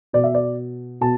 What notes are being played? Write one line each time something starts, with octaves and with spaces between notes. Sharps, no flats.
B2 D5
E5
D5
B2 A5